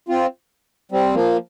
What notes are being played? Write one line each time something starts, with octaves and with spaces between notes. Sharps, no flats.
C4 F4
G3 C4
F3 A#3